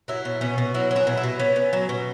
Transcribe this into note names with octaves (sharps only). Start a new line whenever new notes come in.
F#3 E4
B2
B2 C#4
B2
F#3 E4
F#3
E4 G#4
B2
E4
B2
B3 C#4
B3
F#3
B2